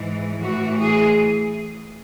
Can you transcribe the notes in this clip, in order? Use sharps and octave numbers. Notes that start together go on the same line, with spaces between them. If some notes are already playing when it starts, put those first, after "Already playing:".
Already playing: G#2 E3
A2 E3 F#4
G#4